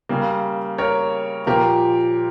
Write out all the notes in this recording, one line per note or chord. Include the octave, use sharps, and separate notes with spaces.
C#3 G3 A#3
A#4 C#5
A#2 F3 A#3 G4 A#4